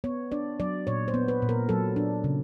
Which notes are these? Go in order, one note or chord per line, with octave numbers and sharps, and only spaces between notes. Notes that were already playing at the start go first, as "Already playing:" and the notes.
B3 C#5
D4 D5
F#3 D5
A#2 C#5
C5
B3
B4
A#2
A#4
F#3 A4
D4
C#3